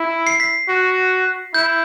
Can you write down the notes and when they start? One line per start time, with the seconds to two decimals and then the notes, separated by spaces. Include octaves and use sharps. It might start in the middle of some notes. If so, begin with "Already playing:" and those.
Already playing: E4
0.27 C7
0.40 B6
0.69 F#4
1.54 E4 G6